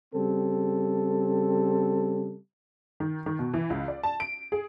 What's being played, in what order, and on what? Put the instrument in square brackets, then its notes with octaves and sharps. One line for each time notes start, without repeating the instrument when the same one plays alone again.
[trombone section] C#3 G3 C4 A4
[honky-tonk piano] D#3
D#3
B2
E3
C#2
D5
A5
D7
G#4